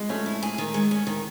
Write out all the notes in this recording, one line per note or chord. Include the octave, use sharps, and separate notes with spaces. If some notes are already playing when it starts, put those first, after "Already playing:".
Already playing: G#3
A3 C#4
E4
G#4
D#3
G#3
C#4
D#3